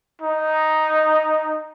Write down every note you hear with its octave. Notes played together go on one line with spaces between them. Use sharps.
D#4